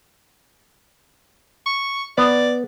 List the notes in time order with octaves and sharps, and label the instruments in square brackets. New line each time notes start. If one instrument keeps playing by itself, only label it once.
[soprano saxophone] C#6
[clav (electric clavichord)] B3 [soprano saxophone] D5